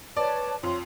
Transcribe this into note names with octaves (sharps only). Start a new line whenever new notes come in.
B4 C#5 D5 A5
F2 C#5 C6